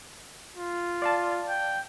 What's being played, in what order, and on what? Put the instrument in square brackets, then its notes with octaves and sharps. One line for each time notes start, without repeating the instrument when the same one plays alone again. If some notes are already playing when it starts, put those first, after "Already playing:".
[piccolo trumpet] F4
[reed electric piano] D5 F5 A5
[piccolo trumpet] G5